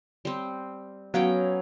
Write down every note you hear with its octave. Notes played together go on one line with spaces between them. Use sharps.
G3 C4
F#3 B3 C#4 F5 G5